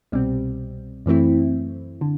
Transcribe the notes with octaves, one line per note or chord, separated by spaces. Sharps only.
C2 B2 G3 C4
F#2 E3 A3 C4 E4
D3